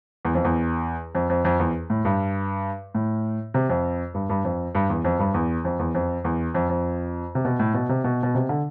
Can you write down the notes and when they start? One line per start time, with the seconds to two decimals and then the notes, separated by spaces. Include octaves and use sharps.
0.25 E2
0.34 F2
0.44 E2
1.15 F2
1.30 F2
1.45 F2
1.59 E2
1.90 A2
2.05 G2
2.95 A2
3.54 C3
3.69 F2
4.14 G2
4.30 G2
4.44 F2
4.75 G2
4.90 E2
5.04 F2
5.19 G2
5.34 E2
5.65 F2
5.79 E2
5.95 F2
6.24 E2
6.55 F2
6.69 F2
7.35 C3
7.45 B2
7.59 A2
7.74 B2
7.89 C3
8.04 B2
8.23 B2
8.35 C3
8.49 D3